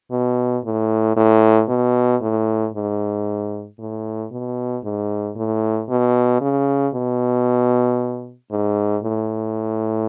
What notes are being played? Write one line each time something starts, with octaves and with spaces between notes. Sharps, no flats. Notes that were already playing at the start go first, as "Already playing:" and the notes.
B2
A2
A2
B2
A2
G#2
A2
B2
G#2
A2
B2
C#3
B2
G#2
A2